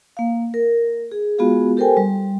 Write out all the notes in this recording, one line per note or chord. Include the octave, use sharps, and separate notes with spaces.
A#3 F5
A#4
G#4
G#3 B3 F4 F#4 G#4 F5
G4 A4 A#4 C5 G5 G#5
G3